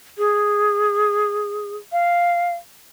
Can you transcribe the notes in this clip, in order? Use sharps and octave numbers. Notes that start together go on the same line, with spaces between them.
G#4
F5